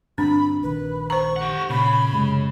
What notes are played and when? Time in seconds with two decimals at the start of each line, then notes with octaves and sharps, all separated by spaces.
0.18 D2 G2 C4 D4 B5
0.63 A#1 D#3 B4
1.10 C5 A#5 C#6
1.36 G4 F#5
1.70 A#2 C#3 B5
2.12 F#2 C3 G#3